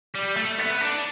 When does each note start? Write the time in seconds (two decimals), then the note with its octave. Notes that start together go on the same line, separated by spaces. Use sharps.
0.15 G3
0.37 A3
0.59 B3
0.81 D4